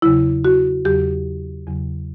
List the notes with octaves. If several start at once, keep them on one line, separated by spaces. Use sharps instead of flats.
E2 C#3 F#3 E4
F#4
E2 C#3 F#3 G4
E2 C#3 F#3